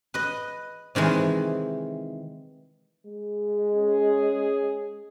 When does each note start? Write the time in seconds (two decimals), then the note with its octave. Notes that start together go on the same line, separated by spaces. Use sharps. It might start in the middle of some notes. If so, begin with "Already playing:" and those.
0.14 B4 D#5
0.95 C3 D#3 E3 G#3
3.07 G#3
3.75 C#4 G#4